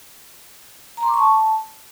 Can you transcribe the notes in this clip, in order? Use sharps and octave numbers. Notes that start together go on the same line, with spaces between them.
A#5
C6
D6
C#6
A5